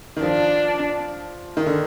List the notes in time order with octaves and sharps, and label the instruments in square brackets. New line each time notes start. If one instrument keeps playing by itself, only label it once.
[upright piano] D#3
[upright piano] F3 [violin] D4
[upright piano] D#3
D3